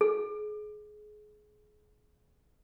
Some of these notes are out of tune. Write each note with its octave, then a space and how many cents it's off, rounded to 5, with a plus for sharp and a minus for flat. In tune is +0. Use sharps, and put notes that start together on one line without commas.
G#4 +25